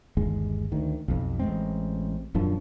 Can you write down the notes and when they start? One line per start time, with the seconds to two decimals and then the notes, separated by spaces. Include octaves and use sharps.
0.17 G1 D#2 G#3
0.72 D2 D#3
1.08 B1 F2
1.39 A1 G#3 C4
2.34 D#1 F#2 F3 D4